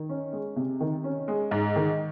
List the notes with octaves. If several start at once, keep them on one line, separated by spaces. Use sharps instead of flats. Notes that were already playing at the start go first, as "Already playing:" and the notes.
Already playing: D#3
C#4
G#3
C3
D#3
C#4
G#3
G#2
D#3